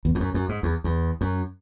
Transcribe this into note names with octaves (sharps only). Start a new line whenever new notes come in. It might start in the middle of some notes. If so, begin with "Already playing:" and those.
E2
E2
F#2
F#2
G#2
E2
E2
F#2